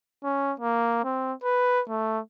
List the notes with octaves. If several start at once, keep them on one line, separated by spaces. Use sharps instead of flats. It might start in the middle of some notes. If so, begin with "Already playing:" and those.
C#4
A#3
C4
B4
A3